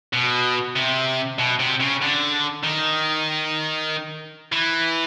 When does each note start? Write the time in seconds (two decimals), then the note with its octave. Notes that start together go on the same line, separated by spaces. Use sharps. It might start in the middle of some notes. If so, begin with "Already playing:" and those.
0.13 B2
0.76 C3
1.39 B2
1.59 C3
1.80 C#3
2.02 D3
2.64 D#3
4.52 E3